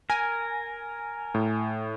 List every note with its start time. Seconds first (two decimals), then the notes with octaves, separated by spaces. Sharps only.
0.10 A#4 G#5
1.34 A2